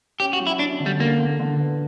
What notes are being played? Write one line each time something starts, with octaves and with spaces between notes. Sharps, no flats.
C#4 G4
F#4
F#3
E4
C#4 D4
D3
G3
D3 A#3
D3
D3
B3